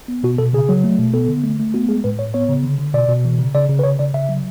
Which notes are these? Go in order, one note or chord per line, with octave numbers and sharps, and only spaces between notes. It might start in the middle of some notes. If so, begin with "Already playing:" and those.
B3
B2 F#4
B2 A4
C#3 G#4
F#3
A3
B2
B3 A4
D3
A3
A3
B3 F#4
G#3 G#4
A2 B4
A2 C#5
B3 C#5
C#3
D3
D3
B2 D5
B2
E3
C#3
C#3 D5
C#3
B4
C#3 C#5
C#3 D5
C#3 E5
F#3